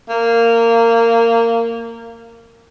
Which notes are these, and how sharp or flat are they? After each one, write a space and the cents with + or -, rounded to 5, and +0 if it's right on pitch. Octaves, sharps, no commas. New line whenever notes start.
A#3 -20